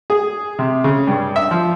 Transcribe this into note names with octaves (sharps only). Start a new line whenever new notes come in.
G#4
C3
C#3
G2
E5
F3